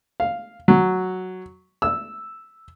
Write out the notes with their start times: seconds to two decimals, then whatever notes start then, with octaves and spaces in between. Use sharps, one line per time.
0.20 F5
0.68 F#3
1.82 E6